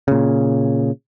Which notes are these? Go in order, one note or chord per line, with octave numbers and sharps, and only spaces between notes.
A#2 C#3